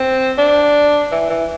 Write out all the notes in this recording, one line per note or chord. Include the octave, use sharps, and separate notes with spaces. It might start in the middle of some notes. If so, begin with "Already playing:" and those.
Already playing: C4
D4
E3
E3